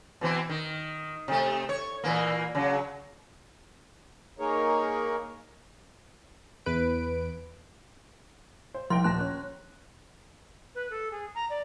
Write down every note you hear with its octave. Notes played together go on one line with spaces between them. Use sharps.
B2 E3 C4
D#3
C3 A3
C#5
A#2 E3 A#3
C#3 F#3
A#3 D#4 G#4 A#4 C#5
E2 B4 D7
C5
C2 F3 G5 C6
D#1 A5 F#6 A#6
C#4
B4
A4
G#4
A#5
D5